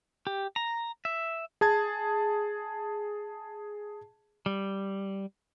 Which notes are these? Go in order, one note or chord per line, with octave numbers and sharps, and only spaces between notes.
G4
A#5
E5
G#4 A5 G#6
G3